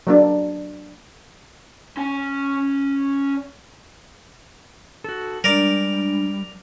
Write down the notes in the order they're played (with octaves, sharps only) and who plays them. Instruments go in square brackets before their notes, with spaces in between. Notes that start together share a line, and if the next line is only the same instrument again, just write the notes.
[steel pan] F#3 A#3 D4
[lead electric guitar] C#4 G#5
[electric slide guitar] F#4 A4
[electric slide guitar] G3 [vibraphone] G#3 D4 [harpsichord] A#4 D5